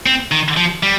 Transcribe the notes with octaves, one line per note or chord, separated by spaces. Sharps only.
C4
D#3
F3
G3